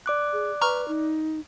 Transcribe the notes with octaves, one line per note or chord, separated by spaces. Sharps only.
D5 D6 F#6
G#4
B4 A#5 C#6 F6
D#4